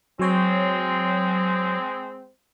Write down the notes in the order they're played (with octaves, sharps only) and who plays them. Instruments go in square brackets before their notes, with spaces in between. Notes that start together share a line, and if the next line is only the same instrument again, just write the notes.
[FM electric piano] F#3 C#5 [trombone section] G#3 C4